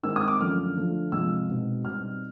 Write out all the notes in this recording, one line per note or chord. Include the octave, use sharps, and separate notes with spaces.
D#3 G#3 C4 D#4 E6
D#6
D6
F#2 D3 F3 A3 C#4 F6
D3 F3 A3 D4
C3 F3 G#3 C4 E6
B2 G#3 C4 D#4
B2 G3 C4 D#4 F6